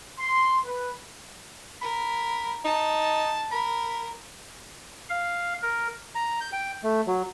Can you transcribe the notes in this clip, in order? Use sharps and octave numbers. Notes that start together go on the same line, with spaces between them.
C6
B4
A#4 B5
D#4 A5
A#4 B5
F5
A#4
A#5
G6
G5
A3
F#3